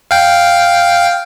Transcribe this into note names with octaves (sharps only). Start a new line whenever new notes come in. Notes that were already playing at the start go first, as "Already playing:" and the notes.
F5 G5